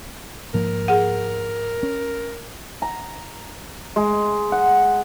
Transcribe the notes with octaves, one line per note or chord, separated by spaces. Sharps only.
G#2 F3 A#3 A#4
G#4 F#5
C#4
A#5
G#3
F#5